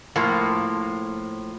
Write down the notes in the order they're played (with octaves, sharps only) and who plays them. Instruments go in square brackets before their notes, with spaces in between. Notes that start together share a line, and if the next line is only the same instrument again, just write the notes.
[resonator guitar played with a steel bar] A2 F3 A#3